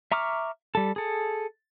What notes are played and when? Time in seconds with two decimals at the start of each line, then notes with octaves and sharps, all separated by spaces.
0.12 E5 A#5 C#6 D6 F6
0.75 G3 A4
0.96 G#4 A4